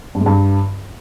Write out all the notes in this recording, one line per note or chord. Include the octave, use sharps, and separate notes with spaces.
G2
G#3
G2